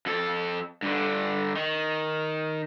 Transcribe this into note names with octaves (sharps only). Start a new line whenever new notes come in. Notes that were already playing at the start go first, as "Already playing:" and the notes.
F2 A4
G2 D3
D#3